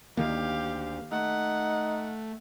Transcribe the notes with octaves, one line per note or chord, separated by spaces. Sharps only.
D2 D#3 A#3 G4 F5
A3 D#4 F#5